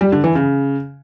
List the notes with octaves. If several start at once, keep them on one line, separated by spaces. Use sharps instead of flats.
G3
D3
E3
C#3